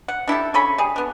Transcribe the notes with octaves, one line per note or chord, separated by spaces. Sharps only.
F#5
D4 E4 G4 A4
C#3 A4 C#5 B5
G3 G#4
B3 D4